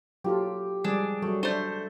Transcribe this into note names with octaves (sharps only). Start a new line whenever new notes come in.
F#3 F4 G4 A4
F3 G3 G#3 D4 G#4
F#3 G3 A3
A3 D4 C5 C#6